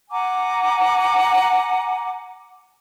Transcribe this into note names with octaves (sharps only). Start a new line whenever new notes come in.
F#5 G#5 A#5 D6